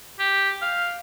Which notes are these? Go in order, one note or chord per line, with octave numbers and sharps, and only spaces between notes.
G4
F5